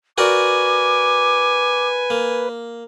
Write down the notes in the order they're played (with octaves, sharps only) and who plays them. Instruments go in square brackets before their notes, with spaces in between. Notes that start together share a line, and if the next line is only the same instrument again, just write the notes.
[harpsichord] F#4 A#4 D5 [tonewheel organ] B4 [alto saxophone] G#5 [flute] D6
[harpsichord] A#3